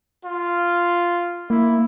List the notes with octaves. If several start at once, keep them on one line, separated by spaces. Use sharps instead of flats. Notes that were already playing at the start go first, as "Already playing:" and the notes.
F4
A#3 E4